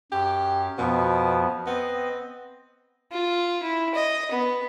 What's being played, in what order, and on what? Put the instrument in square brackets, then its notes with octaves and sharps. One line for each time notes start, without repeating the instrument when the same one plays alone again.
[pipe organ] F#2 [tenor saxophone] G4
[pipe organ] F2 F3 B3 [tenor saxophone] B2
[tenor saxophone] B3 [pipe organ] C4 D#5
[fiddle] F4
E4
D#5
B3